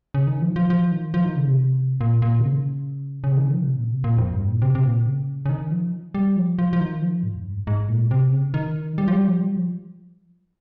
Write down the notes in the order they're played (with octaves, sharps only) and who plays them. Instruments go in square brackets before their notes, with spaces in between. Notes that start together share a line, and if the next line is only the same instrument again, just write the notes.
[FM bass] C#3
D#3
F3
D#3
F3
F3
D#3
F3
D#3
C#3
C3
A#2
A#2
D#3
C#3
C#3
C3
D#3
C#3
F3
C3
A#2
C3
A#2
F2
G2
A#2
C3
C3
A#2
C#3
C#3
D#3
F3
G3
F3
F3
F3
D#3
F3
G#2
F2
G2
G#2
G#2
A#2
C3
C#3
D#3
G3
F3
G3
F3
G3
F3